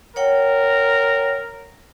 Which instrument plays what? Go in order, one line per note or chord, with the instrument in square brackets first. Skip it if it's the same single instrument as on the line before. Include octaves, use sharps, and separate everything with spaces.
[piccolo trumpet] A#4 [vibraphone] C#5 F#5 G5